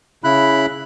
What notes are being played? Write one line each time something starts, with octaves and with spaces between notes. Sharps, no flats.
C#3 E4 B5 F#6